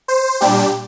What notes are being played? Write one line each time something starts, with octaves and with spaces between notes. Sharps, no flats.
C5
A#2 G3 D4 G4